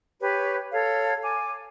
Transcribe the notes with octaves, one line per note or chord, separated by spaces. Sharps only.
G4 B4 C#5
A4 C#5 F5
G#5 D6